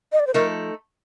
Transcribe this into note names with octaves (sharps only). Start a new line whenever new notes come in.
D#5
D5
C5
F3 A3 D#4 A4 A#4